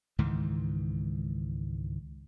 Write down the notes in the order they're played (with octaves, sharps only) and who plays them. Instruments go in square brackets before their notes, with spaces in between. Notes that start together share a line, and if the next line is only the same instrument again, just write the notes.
[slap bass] C#2 G#2 D#3 E3